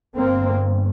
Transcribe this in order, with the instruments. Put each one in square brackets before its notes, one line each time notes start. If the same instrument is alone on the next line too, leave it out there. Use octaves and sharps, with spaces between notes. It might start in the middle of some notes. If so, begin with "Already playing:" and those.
[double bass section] G1 G2 A#3 C4